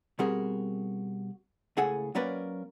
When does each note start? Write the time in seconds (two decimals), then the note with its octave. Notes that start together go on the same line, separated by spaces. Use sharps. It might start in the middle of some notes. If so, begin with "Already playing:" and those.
0.19 B2 G3 C4 F#4 G#4 A#4
1.77 C#2 A2 G#4 A4 F#5 G#5
2.15 F#3 A#3 C#4 A#4 B4 D5